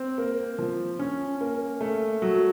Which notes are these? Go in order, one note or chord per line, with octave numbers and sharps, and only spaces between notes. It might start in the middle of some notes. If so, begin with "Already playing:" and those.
Already playing: C4
A#3
F3
C#4
A#3
A3
F#3